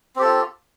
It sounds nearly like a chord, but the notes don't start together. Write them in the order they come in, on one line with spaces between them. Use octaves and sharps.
C4 G4 A4 F4